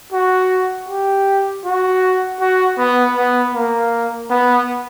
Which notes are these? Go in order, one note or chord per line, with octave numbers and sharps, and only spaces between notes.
F#4
G4
F#4
F#4
B3
B3
A#3
B3